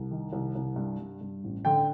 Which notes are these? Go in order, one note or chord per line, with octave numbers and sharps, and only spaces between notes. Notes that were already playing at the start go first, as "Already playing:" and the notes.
Already playing: C2
D#3
C2
C2
G2
G2
G2
A1
D3 G5